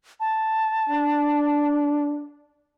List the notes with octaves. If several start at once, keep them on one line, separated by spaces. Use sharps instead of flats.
A5
D4